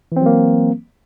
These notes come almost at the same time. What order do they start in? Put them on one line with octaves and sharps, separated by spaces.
E3 C4 F#3 A#3